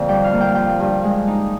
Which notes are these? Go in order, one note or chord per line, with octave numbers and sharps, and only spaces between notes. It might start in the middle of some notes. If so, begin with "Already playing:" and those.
Already playing: F2 D3 A#3
G3 G5
F5
A#3
G5
F3 G5
G2
G#3
D#4